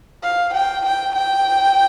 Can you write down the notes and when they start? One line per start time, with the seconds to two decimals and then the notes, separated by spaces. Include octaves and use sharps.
0.23 F5
0.54 G5
0.86 G5
1.16 G5